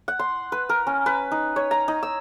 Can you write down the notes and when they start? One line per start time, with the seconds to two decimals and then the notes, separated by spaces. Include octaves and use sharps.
0.08 F#5
0.19 C6
0.52 B4
0.69 A#4
0.87 C#4
1.06 B4
1.32 D#4
1.56 C#5
1.71 A#5
1.88 D#4
2.03 E6